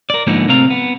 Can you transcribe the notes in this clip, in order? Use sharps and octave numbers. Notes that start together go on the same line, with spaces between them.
A#4 D5
G#2 D3 F3 A#3 B3 D#4
C3 A3 C4 A#4 F5 A#5
B3